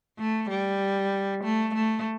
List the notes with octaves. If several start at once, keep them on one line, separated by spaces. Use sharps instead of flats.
A3
G3
A3
A3